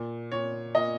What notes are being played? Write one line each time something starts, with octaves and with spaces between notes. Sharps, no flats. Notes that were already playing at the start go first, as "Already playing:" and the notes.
Already playing: A#2
A#2 C#5
A#2 D#5